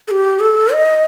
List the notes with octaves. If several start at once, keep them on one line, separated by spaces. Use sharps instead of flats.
A4
G4
A4
D#5